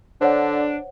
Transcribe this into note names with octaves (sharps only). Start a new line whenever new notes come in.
D3 D4 C5 C#5 F#5